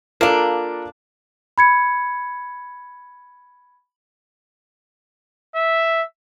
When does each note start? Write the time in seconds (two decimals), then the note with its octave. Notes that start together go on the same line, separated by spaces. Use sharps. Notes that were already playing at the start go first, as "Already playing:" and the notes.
0.21 A#3 D4 F4 A4 A#4
1.58 B5 G#6 C#7
5.55 E5